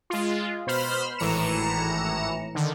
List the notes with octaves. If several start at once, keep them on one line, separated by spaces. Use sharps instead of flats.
G#3 F4
B2 C5 B5 C6 F6
G#1 A2 E3 A#5 C#7 E7
D3 D#3